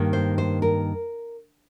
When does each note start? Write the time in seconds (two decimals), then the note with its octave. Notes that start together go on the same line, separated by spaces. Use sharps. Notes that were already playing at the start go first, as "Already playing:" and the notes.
Already playing: G2 D#3 A#3
0.13 C5
0.38 C5
0.62 A#4